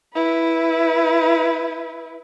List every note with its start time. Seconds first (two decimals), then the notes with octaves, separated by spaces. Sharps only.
0.15 E4 B4